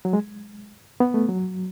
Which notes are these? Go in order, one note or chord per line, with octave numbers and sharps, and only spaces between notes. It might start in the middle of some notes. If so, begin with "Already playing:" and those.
F#3
G#3
B3
A3
F#3